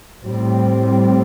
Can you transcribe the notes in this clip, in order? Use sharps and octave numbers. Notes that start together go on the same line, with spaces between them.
A2 G3 C4